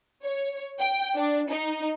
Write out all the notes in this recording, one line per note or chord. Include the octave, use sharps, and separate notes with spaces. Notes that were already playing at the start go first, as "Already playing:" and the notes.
C#5
G5
D4
D#4